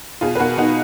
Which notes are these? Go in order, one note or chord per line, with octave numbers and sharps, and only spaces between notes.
B2 F4 G#4
B4
B2 F#4 A#4
B2 D#4 F#4